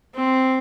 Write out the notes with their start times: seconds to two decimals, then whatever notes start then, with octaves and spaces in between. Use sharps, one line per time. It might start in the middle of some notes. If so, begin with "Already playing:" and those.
0.15 C4